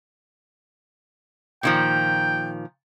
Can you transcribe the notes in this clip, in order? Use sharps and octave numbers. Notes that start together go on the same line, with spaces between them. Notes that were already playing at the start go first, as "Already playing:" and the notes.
A#2 D#3 F3 G5